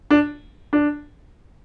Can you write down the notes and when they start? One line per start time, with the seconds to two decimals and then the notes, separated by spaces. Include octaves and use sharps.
0.11 D4
0.73 D4